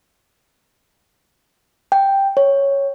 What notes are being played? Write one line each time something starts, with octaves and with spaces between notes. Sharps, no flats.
G5
C#5